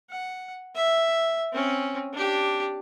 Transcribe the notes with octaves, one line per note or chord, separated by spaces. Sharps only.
F#5
E5
C4 C#4
D4 G4